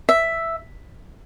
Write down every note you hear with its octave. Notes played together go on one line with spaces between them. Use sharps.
E5